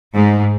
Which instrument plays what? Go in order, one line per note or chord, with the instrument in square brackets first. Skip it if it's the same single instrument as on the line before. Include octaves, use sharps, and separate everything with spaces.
[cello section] G#2